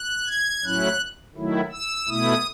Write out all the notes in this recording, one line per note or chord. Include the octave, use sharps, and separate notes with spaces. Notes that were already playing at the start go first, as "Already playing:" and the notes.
Already playing: F#6
G#6
A2 F#3 C#4 E4 F#6
D#3 F#3 A3 E4
E6
B2 A3 E4 D#6